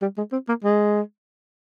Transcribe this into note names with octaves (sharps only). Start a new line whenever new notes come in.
G3
G#3
C4
A#3
G#3